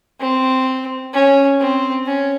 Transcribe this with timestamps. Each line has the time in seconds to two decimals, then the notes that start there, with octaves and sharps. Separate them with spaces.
0.20 C4
1.14 C#4
1.60 C4
2.06 C#4